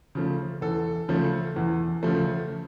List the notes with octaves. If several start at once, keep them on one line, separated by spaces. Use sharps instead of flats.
C#3 F3 A3
E2 A4
C#3 F3 A3
E2
C#3 F3 A3